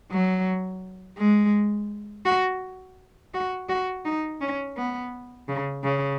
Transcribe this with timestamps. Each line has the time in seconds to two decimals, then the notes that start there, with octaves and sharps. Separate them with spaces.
0.11 F#3
1.18 G#3
2.25 F#4
3.34 F#4
3.69 F#4
4.05 D#4
4.41 C#4
4.77 B3
5.48 C#3
5.84 C#3